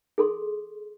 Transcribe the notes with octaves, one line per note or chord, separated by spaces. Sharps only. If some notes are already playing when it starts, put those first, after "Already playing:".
G#4 A4 C6